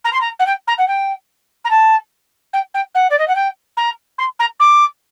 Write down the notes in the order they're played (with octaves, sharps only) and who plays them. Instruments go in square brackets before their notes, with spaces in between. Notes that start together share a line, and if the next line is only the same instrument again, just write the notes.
[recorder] A#5
C6
A#5
F#5
G5
A#5
F#5
G5
A#5
A5
G5
G5
F#5
D5
D#5
F#5
G5
A#5
C6
A#5
D6